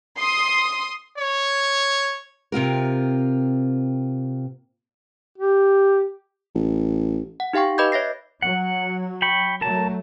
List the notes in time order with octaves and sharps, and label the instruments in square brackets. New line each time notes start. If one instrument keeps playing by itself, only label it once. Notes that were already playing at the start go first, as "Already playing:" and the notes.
[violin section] C6 D#6
[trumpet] C#5
[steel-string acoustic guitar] C3 C4 F4 A#4
[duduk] G4
[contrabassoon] A1
[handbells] F#5
D#4 G4 F5 G5 C#6
B4 D#5 B5 D6 G6 G#6
C#5 E5 A#6 C7
[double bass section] F#3 [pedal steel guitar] F#5
[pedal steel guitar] G5 B5 C#6
[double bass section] F#3 A3 [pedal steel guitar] A#4 A5